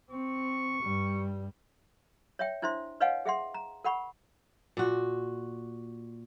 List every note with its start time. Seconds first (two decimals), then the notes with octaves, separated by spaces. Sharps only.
0.10 C4 C#6
0.82 G2 G3
2.39 C#5 E5 G5
2.62 D4 E4 C5 E5 C6
3.00 B4 C#5 D#5 F5 F#5 G#5
3.25 G#4 E5 F#5 C6
3.54 A#5
3.84 A#4 F#5 B5 C#6
4.77 A#2 F#4